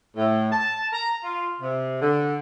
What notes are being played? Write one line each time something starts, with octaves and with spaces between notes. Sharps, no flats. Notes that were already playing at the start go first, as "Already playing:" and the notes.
A2
A5
A#5
F4
C3
D3